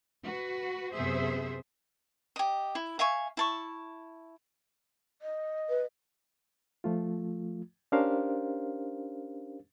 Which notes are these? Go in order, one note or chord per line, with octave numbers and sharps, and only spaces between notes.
F#4 B4
F#2 C3 B3 G#4 C5 E5
G4 D#5
E4
E5 F5 G#5 C#6
E4 A5 C#6
D#5
B4
F3 A3 F4
C#4 D4 G4 A#4 C5 F5